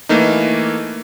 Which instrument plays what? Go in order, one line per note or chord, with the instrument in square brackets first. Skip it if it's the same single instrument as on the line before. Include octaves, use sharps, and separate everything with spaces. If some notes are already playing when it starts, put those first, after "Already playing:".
[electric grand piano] E3 A3 A#3 D#4